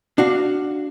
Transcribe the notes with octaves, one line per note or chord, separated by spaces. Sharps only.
D4 F#4 F5